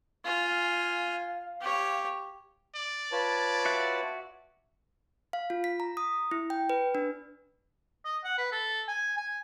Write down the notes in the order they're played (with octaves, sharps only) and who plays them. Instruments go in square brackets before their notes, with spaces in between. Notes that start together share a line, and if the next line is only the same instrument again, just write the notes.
[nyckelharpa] F4 G#5 [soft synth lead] F5
[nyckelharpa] G4 C#5
[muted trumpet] D5
[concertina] F4 C#5 [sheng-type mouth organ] B4 A5
[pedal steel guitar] F#4 E5 F#6
[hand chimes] F5
F4
B6
A#5
D#6
E4
G5
B4
D4
[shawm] D#5
F#5
B4
A4
G#5
G#5